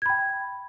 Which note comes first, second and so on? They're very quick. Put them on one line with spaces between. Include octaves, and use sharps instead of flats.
G#6 B5 G5